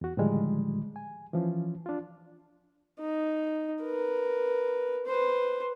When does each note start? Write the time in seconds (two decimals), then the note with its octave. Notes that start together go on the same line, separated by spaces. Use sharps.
0.01 E2 F#4
0.17 A2 D3 D#3 F3 G3 G#3
0.96 G#5
1.33 E3 F3 C#4
1.86 D4 F4
3.00 D#4
3.83 A#4 B4
5.06 B4 C5